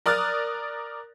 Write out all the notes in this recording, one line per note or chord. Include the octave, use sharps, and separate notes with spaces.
A#4 D5 D#6 F6 F#6 A6